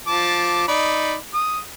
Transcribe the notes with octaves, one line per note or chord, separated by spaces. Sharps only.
F3 A5 D6
D#4 D5 B5
D#6